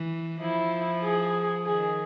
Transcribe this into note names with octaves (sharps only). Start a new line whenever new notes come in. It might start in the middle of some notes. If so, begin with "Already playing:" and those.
Already playing: E3
F3 E4
G#4
D#3 G#4